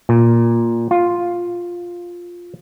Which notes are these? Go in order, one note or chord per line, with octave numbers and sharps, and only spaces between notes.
A#2
F4